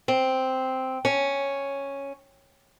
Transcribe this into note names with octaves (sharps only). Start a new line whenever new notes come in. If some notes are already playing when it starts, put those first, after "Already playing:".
C4
C#4